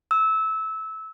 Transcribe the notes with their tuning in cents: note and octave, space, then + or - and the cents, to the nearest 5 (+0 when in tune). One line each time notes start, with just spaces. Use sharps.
E6 -20